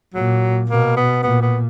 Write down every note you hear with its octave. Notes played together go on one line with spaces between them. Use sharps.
A#2 F#3
B2 A#3
B3
A#2 B3
B3